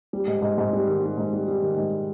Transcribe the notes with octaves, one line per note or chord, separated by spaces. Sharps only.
G3
G#2
G#2
G#2
G3
D#3
G3
G#2
G3
G3
D#3
G#2